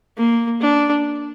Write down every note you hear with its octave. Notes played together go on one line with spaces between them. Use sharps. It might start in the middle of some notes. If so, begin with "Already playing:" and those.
A#3
D4